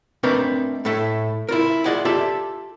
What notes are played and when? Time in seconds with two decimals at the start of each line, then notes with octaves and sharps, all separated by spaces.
0.23 A3 C4 D4 D#4 A#4 B4
0.85 A2 A3 A4 E5
1.49 E4 F4 A#4
1.85 F4 G#4 D5 D#5 F#5
2.05 F4 G4 A4 D5 E5